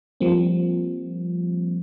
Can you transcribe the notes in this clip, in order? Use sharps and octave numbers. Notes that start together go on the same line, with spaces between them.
F3 G3 A#3 C4